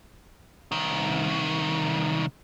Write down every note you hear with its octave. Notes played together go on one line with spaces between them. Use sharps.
C2 D#3